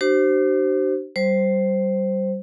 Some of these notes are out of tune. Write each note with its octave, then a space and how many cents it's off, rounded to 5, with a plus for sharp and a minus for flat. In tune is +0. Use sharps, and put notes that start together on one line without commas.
D4 +30 G4 -45 C5 +0
G3 -25 C5 +0